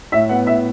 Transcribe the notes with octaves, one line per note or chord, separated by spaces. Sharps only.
A2 E5
B3 F#5
A2 E5